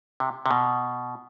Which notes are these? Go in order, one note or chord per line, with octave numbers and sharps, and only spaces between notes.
C3
C3
B2